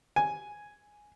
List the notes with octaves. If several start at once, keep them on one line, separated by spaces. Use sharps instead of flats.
G#5